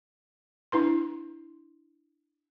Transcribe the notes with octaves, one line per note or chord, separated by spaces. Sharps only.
D4 E4 B4 C6